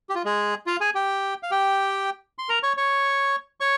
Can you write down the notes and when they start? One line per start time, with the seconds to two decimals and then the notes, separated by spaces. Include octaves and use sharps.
0.09 G4
0.15 F4
0.24 G#3 G#4
0.66 F4 F5
0.80 G#4 G#5
0.95 G4 G5
1.43 F5
1.51 G4 G5
2.38 C6
2.49 A#4 A#5
2.63 C#5 C#6
2.77 C#5 C#6
3.60 C#5 C#6